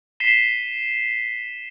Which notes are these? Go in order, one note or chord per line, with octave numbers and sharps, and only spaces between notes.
B6 C7 D#7 E7 G7